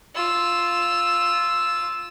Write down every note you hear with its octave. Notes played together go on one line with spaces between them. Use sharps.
F4 E6